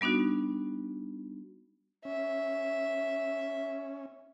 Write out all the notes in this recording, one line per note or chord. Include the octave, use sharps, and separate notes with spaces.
G3 B3 D4 D#4 F#4
C#4 E5